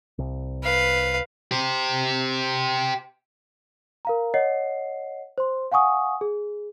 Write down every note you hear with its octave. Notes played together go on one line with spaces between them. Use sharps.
C2
B4 F5
G4 C5
A#4 F5 A#5
C#5 D#5 F#5 C7
C5 C6
F5 F#5 G#5 C#6 D#6
G#4